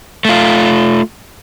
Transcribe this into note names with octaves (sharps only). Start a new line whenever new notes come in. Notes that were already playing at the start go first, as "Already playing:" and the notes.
A3 F4